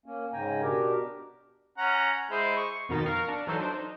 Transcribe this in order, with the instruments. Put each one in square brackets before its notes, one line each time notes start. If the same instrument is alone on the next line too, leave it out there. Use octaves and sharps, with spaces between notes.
[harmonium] A#3 C#4
G#2 C#3 G5 G#5 A#5
B2 D4 G4 A#4
[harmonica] C#4 F#5 A#5
G#3 E4 C5
C#6
[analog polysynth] F2 B2 D#3 D#4 A6 B6
A#4 F5 A#5 C#6 F6
D4
E3 F#3 D#4 A4 C5
D4 C5
D#4